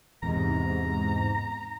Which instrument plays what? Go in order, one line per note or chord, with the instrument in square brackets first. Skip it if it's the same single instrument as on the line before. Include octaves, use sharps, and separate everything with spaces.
[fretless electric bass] E2 C3 [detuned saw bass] G#2 [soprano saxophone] A#5